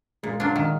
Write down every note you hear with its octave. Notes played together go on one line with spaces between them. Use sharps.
A#2 G#3
F#3 D4 F4
D#3